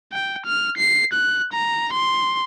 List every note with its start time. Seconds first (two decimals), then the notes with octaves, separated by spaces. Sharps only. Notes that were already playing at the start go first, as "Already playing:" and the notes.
0.13 G5
0.46 F6
0.77 C7
1.14 F#6
1.53 A#5
1.93 C6